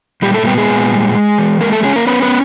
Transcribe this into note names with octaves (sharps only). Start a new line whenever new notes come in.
A#2 G3 G4
A3 A4
G3 B3 G4
G#3 G#4
A#2
G3
G#3
E3
G#3 A#3 A#4
A3 A4
G#3 C#4 G#4
A#3 A#4
B3 C#4 B4
B3 B4